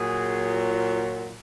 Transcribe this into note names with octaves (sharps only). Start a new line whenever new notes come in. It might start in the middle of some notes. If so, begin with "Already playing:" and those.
Already playing: A#2 F#3 G#4